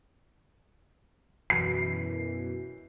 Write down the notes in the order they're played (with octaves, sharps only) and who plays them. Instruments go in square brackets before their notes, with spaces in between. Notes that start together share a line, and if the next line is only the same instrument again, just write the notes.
[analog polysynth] F#2 B2 E3 [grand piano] C7